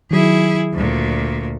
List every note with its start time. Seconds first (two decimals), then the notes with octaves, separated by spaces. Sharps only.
0.11 D#3 F#3 E4 G#4
0.73 D2 A#2